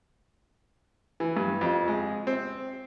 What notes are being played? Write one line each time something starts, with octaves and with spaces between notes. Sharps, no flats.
E3
G2
F2
G#3
C4